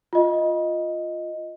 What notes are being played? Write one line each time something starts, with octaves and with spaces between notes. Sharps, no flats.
F4 D#5